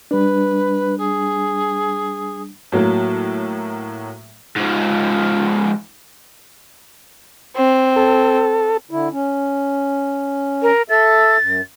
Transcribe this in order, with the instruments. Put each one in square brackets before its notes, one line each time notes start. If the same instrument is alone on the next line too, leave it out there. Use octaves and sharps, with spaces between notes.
[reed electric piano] G3 D4 [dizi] B4
[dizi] G#4
[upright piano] A2 F#3 A#3
[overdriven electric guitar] G#2 F3
[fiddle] C4
[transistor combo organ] A4
[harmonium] D3 E4
C#4
[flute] A#4
[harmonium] A4 E5 [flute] A6
[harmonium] F#2